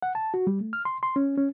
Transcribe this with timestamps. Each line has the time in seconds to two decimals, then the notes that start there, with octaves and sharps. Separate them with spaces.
0.02 F#5
0.15 A5
0.34 F#4
0.47 G3
0.61 A3
0.73 F6
0.85 C6
1.03 C6
1.16 C#4
1.38 C#4